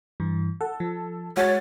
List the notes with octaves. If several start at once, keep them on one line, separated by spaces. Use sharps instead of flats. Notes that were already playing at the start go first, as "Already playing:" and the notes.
G2 E3
A4 F#5
F3
G#3 F#4 C#5 A6